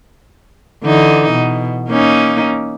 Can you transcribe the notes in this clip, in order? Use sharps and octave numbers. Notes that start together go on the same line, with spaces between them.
D3 E3 D#4
B2
A#3 C#4 D#4